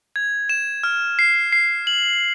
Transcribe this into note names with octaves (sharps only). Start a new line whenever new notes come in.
G#6
E7
F6
C7
C7
F#7